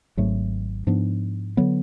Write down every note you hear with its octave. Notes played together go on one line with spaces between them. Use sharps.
G#1 G#2 F#3 A3
G#2 F3 B3 D4
D3 F#3 B3